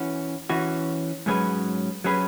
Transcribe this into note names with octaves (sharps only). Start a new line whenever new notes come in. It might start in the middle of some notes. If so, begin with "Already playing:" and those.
Already playing: E3 C#4 F#4
E3 C#4 F#4
G#2 F#3 C#4 G#4 B4
F#3 C#4 G#4 B4